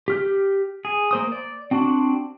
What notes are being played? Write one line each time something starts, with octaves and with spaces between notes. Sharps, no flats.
G4 F6 G6
G#4
A#3 C5 D#6
D5
C4 D4 F#4